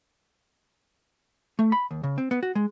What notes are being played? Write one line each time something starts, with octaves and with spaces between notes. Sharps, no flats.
A3
B5
D#2
C#3
C4
B3
F#4
G#3